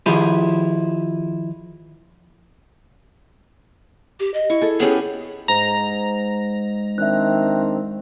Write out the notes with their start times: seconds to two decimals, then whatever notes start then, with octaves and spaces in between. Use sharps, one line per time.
0.06 D#3 F3 E4 G4 G#4
4.20 G4
4.34 D#5
4.50 E4 C#6
4.61 G#4 A4
4.80 B3 C#4 G4 G#4
5.48 G#2 A#5
6.98 D#3 C4 D4 E5 F#6